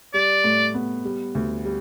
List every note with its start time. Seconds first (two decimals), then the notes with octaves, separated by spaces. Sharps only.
0.14 G3 D5
0.44 A2
0.74 B3
1.05 G3
1.35 D2
1.65 G3